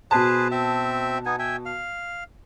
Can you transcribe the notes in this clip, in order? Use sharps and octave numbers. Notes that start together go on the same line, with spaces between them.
B2 G#4 B4 C5 A5
C4 E5
B3 D#4 G#5
E5 G5 G#5
F5